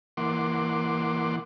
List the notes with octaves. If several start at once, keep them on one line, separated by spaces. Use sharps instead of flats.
E3 A#3 F#5 C6 D6